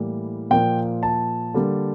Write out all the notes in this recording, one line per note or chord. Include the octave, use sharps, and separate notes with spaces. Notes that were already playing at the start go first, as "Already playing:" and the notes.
Already playing: A2 E3 G3 A#3
A#2 F3 A#3 G5
A5
D3 G3 A#3